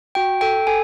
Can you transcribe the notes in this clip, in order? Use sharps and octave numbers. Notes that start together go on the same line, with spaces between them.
F#4 G5
A4 G5
A4 G#5